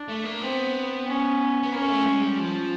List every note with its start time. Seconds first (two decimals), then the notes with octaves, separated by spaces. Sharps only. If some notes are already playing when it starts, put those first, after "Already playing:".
Already playing: D4
0.09 A3
0.25 A#3
0.42 B3 C4
1.07 C#4
1.63 B3
1.73 A#3 C#4
1.89 A3
2.06 G#3
2.22 G3
2.38 F3